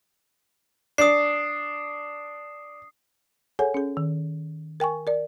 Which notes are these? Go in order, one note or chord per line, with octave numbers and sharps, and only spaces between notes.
D4 D#6 C7
G#4 A4 C#5 F#5 G#5
C#4 G#4
D#3
A#4 G5 G#5 C#6
A#4 D5